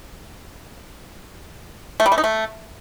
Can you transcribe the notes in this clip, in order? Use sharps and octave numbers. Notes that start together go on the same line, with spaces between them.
A3
G3
A3
D#4
A3